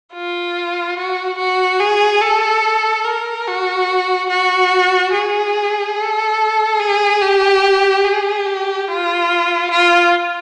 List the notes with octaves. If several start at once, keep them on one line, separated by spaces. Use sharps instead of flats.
F4
F#4
F#4
G#4
A4
A#4
F#4
F#4
G#4
A4
G#4
G4
G#4
G4
F4
F4